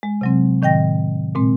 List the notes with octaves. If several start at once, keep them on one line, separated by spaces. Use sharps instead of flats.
G#3
C3 F#3 C4
A2 D#3 D#5 G5 A#6
A#2 G#3 C4